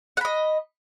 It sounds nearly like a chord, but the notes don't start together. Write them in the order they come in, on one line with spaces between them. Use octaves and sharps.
F#5 B5 D#5